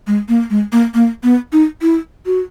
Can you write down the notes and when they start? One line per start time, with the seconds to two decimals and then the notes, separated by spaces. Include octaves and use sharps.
0.07 G#3
0.29 A#3
0.50 G#3
0.72 A#3
0.94 A#3
1.23 B3
1.53 D#4
1.82 E4
2.26 F#4